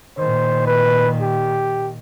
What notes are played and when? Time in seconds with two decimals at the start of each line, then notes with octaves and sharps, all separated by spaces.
0.18 A#2 D#3 C5
0.67 B4
1.21 G4